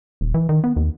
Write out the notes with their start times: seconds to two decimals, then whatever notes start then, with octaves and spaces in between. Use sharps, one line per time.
0.21 D#1
0.34 E3
0.49 D#3
0.64 B3
0.76 D#2